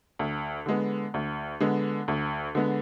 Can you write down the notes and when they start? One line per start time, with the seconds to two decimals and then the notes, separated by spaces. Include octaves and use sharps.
0.19 D2
0.66 D3 G#3 B3
1.14 D2
1.60 D3 G#3 B3
2.08 D2
2.55 D3 G#3 B3